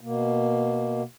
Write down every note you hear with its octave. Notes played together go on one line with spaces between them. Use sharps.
B2 A#3